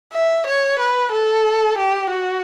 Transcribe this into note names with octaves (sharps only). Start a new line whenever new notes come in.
E5
C#5
B4
A4
G4
F#4